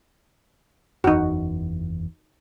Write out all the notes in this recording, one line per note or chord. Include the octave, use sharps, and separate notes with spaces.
F#1 E2 D#4 F#4